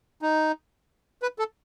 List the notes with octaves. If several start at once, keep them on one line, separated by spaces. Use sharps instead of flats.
D#4
B4
A4